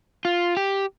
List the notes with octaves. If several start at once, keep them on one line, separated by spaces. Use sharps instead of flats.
F4
G4